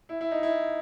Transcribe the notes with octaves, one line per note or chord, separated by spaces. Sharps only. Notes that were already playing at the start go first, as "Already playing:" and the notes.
E4
E4
D#4
E4